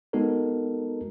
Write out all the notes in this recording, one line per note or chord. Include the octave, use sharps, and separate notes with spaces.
G#3 B3 D#4 F#4 A4 A#4